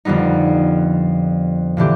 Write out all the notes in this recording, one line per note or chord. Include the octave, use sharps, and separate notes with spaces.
F2 D3 G3 B3 D#4
A#2 D3 E3 G4